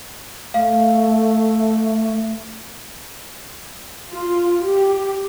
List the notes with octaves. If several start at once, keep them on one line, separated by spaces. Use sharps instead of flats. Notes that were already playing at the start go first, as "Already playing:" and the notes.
A3 F5
F4
G4